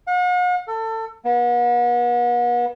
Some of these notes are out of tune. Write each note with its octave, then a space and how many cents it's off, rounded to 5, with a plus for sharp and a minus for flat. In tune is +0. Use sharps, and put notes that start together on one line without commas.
F#5 -45
A4 +25
B3 -40